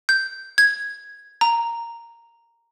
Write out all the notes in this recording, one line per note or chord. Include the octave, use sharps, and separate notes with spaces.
G6
G#6
A#5